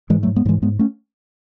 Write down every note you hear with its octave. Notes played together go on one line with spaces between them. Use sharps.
G#2 E3 G#3
F#3 A3
G#2
G#3 B3
G#2 E3 F#3 G#3
G#2 G#3 B3
A3 C#4